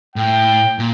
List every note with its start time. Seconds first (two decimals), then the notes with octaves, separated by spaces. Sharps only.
0.16 A2 G5
0.79 A#2